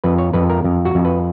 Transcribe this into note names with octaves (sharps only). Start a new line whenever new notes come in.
F2 B4
C#5
F2 B4
A#4
F2
F#4
F2
B4